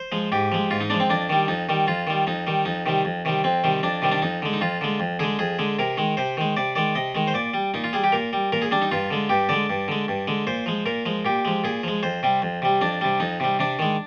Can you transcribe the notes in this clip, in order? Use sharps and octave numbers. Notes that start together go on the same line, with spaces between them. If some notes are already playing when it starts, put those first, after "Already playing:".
Already playing: C5
F3 G#3
G#2 G4
F3 G#3
G#2 F4
D#4
F3 G#3 D4
C4
F2 D4
D#3 G3
F2 D#4
D#3 G3
F2 F4
D#3 G3
F2 D#4
D#3 G3
F2 D#4
C3 D#3 G3
F2
C3 D#3 G3
F2 C4
C3 D#3 G3
F2 D4
C3 D#3 G3
D4
F2 D#4
D3 G#3
D#4
F2 F4
D3 G#3
F2
D3 G#3 G#4
F2 G#4
D3 G#3
C3 A#4
D#3 G#3
C3 C5
D#3 G#3
C3 D5
D#3 G#3 D5
C3 D#5
D#3 G#3
C5
A#2 D5
G3
A#2 D#4
F4
G3 G#4
G4
A#2 A#4
G3
A#2 A#4
G#4
G3 D4
D#4
G2 F4
D3 G#3
G2 G4
D3 G#3 D5
G2
D3 G#3
G2
D3 G#3
A#2 C5
F3 G#3
A#2 A#4
F3 G#3
A#2 G4
F3 G#3
A#2 G#4
F3 G#3
F2 C5
C3 G3
F2
C3 G3
F2 D4
C3 G3
F2 D#4
C3 G3
C3 D4
D#3 G#3